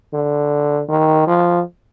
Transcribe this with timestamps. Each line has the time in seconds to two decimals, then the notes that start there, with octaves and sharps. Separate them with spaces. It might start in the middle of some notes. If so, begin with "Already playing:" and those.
0.13 D3
0.89 D#3
1.27 F3